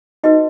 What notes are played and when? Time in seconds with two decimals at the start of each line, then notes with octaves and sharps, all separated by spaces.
0.24 D#4 F#4 B4 D#5